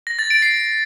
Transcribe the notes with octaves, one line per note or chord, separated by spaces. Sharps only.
A#6
A6
D7
C7